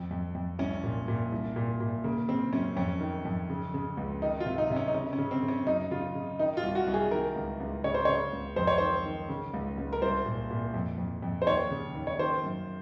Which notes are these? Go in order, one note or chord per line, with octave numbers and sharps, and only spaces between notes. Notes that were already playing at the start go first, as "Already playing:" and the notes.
Already playing: F2
F2
F2
C2 C#4
A#2
A#2
C2
A#2
A#2
C#3 A#3
C#3 C4
F#2 C#4
F2 C#4
D#3
F2
C#3
C#3
C#2
D#3 D#4
F4
C3
D#4
C3
C#4
D#4
C#3 C#4
C#4
C#3
C4
C#3
C#4
F#2 D#4
C#3 F4
C#3
D#3 D#4
F4
C2
F#4
C2
G#4
D#3 A#4
C#2
C#2
C#3 C#5
C5
C#3 C#5
C#2
F2 C5
C#5
D#3 C5
D#3
C#3
C#2
C#2
A#4
C2 C5
A#2
A#2
F2
F2
F2
C5
D#2 C#5
C#3
D#2
C#5
D#3 C5
F#2